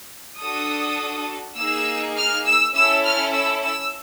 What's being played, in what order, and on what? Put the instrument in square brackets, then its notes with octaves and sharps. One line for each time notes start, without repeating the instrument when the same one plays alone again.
[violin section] D4 F#4 A4 D#6
A#3 D#4 G#4 E6
F6
E6
C#4 E4 A4 E6
F6
E6
E6